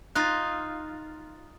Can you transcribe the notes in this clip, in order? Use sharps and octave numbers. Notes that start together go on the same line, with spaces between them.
D#4 F4 F#6 A6